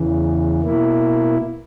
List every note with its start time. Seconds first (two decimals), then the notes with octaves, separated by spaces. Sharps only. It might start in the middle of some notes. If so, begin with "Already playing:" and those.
Already playing: E2 C#3 E3
0.62 B2 A#3 E4